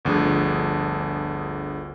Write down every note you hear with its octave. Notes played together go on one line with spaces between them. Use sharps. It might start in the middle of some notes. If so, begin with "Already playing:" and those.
G1 D2 F3 D4 G#4